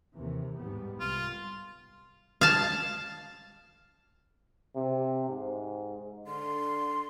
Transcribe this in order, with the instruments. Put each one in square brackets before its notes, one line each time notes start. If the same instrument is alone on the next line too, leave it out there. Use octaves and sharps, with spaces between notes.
[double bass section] D#2 C3 E3
G#2 G3 B3
[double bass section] C2 [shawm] F4
[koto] F5 A5
[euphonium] C3
G#2
[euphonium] D3 [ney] C6